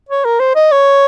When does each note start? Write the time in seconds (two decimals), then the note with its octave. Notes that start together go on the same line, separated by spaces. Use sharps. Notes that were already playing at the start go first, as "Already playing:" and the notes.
0.09 C#5
0.25 A#4
0.39 C5
0.55 D#5
0.72 C#5